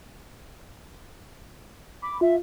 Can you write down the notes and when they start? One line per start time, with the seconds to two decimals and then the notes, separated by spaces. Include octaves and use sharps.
2.02 B5 D6
2.21 F4 E5